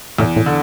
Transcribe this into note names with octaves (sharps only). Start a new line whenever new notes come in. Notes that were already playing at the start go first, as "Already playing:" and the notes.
E2 A2
A2
D3